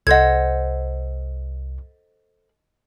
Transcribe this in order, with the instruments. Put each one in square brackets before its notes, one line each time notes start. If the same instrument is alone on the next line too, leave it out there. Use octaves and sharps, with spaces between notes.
[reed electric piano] C2 [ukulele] A4 C5 F#5 [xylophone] D#5 G#6